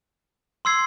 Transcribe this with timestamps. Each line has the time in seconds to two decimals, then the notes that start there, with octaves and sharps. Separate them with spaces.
0.65 C6 E6 G#6 C7